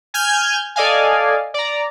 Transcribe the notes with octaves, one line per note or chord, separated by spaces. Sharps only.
G#5 F6 G6 G#6
A4 D5 D#5 F5 G#5
D5 A#5